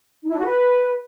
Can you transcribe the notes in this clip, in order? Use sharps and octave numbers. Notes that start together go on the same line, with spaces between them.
D#4
E4
D4
F#4
B4